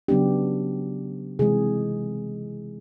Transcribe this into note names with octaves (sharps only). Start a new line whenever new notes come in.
C#3 F#3 B3 D4 G4
C3 E3 G#3 G#4